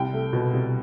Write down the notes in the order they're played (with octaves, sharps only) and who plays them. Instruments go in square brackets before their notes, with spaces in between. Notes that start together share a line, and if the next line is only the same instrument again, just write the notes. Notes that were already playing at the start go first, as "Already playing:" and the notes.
Already playing: [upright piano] C2 G5
A3
B2
C2